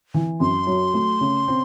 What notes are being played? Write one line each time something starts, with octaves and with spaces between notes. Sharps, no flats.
E3
F#2 C6
F#3
A3
C#3
C4